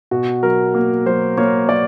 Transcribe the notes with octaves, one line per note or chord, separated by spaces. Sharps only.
B2 F#4
F#3 A#4
A#3
F#3 C5
A#3 C#5
A#3 D5